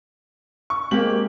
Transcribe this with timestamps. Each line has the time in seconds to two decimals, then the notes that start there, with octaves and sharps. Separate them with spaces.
0.70 C#6
0.91 G#3 A#3 C4 G4 F#7